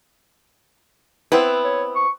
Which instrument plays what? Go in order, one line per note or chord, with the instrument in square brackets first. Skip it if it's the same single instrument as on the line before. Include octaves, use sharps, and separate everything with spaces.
[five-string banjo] B3 C4 E4 [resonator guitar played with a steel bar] B4
[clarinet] C#5
C#6